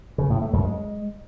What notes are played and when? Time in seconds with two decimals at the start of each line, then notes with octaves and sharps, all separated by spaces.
0.18 C#3
0.30 A2
0.41 A3
0.53 F#2
0.65 G#3